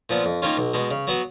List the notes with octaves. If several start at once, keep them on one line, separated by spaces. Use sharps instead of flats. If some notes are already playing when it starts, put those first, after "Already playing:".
A#2 F3 B3
F2
D#3 A#3 C#4 F4
B1
B2 G#3
C#3
F#3 B3 F#4